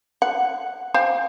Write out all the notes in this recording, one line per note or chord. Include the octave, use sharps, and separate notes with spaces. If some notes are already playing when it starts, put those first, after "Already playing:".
F#5
C5 F5 G5